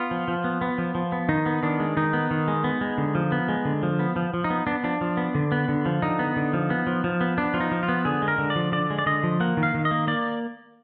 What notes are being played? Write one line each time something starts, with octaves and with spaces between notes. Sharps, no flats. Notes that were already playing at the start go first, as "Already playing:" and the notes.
Already playing: B3 F4
F3
F3
B3
B3
F3
F3
B3
D#3 D#4
B3
D#3 D4
G#3
D#3 D#4
B3
D#3
G#3
B3
G#3
D3
F3
B3
G#3
D3
F3
B3
F3
F3
D#4
B3
B3 D4
F3 D4
F3
B3
D3
B3
D3
F3
D3 D#4
B3
D3
F3
B3
F3
F3
B3
B3 D4
F3 F4
D#4
F3
F4
B3
D3 G#4
G#3
A#4
D3
D5
F3
D3 D5
G#3
D5
D3 D#5
F3
A#3 F#5
D#3
F5
D#3
D#5
A#3
A#3 D5